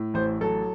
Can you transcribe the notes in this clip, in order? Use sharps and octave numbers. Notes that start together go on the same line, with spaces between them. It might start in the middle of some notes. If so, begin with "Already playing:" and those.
Already playing: A2
A1 C5
F#3 A4